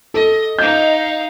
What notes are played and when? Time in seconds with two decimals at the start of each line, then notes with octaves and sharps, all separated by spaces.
0.14 A4 D#5
0.59 D#4 D#5 F5 G6